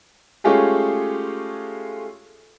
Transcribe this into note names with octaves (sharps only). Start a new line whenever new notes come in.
G#3 A3 C#4 F4 G4 G#4